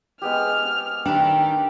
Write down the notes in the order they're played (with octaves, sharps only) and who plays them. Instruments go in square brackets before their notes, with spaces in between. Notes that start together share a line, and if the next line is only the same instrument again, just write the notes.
[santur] G#3 B3 G4 [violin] F6
[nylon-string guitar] D#3 D4 [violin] G4 [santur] A#4 B4 E5 [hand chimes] G5